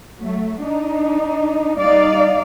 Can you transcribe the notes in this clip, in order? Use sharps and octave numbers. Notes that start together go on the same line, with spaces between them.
F#3 A3
D4 D#4
G3 D#4 D5 F5